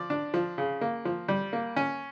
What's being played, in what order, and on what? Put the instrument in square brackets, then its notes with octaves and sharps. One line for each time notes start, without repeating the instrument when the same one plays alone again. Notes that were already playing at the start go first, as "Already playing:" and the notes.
Already playing: [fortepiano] F3 D5
D4
F3
C#3
A#3
F3
G3
A#3
C#4